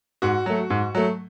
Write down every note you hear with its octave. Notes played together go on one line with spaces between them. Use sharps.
G#2 F#4
F#3 A3
G#2
F#3 A3